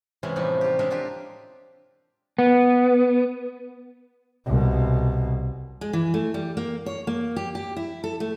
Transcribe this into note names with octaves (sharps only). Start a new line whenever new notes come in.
C3 E3 G#3 C#4
E2 A2 F3 G3 D#4 E4
F4 G4
G#3 D4 F4 A#4 E5
D4 F4 G4 E5
B3
C2 B2
G#3
E3
A3
G3
A#3
C#5
A#3
G4
G4
E4
A4
A3